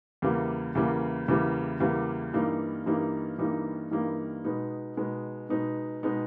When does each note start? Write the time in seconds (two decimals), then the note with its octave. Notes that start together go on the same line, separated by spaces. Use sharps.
0.22 E2 C#3 E3 G3 A#3
0.75 E2 C#3 E3 G3 A#3
1.28 E2 C#3 E3 G3 A#3
1.80 E2 C#3 E3 G3 A#3
2.33 G2 E3 G3 A#3 D#4
2.86 G2 E3 G3 A#3 D#4
3.38 G2 E3 G3 A#3 D#4
3.91 G2 E3 G3 A#3 D#4
4.44 B2 G#3 B3 D#4
4.97 B2 G#3 B3 D#4
5.50 B2 G#3 B3 D#4
6.03 B2 G#3 B3 D#4